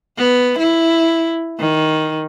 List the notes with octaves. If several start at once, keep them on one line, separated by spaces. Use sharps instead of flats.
B3
E4
D#3